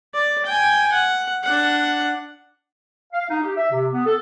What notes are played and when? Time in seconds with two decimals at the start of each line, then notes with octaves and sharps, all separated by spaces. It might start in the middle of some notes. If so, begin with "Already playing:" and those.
0.14 D5
0.46 G5 G#5
0.93 F#5
1.43 D4 F#5
3.13 F5
3.30 D#4
3.43 G4
3.57 E5
3.72 C3
3.93 B3
4.06 A4